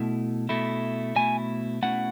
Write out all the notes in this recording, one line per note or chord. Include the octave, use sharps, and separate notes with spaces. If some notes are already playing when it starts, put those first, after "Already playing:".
Already playing: B2 A3 E4
B2 A3 E4
B2 A3 E4 G#5
B2 A3 C#4 E4 F#5